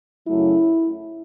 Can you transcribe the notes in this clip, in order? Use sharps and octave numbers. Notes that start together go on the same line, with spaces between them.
F#2 C#3 F#3 A3 E4